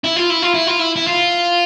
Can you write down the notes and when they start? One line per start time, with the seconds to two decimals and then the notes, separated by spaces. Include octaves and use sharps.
0.04 E4
0.16 F4
0.30 E4
0.42 F4
0.54 E4
0.67 F4
0.79 E4
0.96 E4
1.07 F4